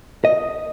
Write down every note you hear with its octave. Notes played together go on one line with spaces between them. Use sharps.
D#5